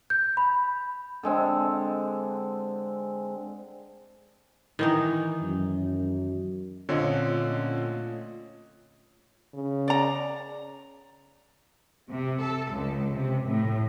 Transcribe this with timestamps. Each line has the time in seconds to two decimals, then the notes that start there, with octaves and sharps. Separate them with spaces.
0.10 G6
0.37 B5
1.23 D3 G#3 C4
4.79 D#3 E3 D#4
5.42 F#2
6.89 A#2 D3 A3 C4 C#4 F4 C#5 D#5
9.54 C#3
9.88 D5 A#5
12.08 C3
12.40 A4
12.71 C#2
13.15 C3
13.47 A2